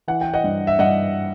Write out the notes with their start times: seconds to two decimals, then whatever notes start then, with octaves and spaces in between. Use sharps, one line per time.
0.08 E3 F#5
0.21 G5
0.34 D#5 F#5
0.44 G2
0.67 E5
0.79 G2 D#5 F#5